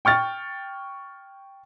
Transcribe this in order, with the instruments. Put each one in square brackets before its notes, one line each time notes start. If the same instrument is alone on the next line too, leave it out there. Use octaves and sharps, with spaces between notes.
[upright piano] G5 C#6 F6 A6